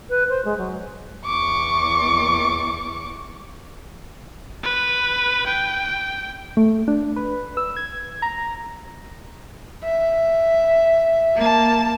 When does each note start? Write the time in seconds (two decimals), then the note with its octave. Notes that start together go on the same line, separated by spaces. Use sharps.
0.09 B4
0.29 C5
0.45 G#3
0.58 F#3
1.25 E2 C#6 D6
4.63 B4
5.47 G5
6.57 A3
6.88 D4
7.16 B4
7.57 E6
7.76 G#6
8.22 A#5
9.84 E5
11.36 A#3 A5